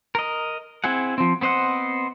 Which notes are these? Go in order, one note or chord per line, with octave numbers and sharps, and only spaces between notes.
A#4 D#5
C4 E4 G#4 F#5
F3 C4
B3 C4 C5 D#5 F#5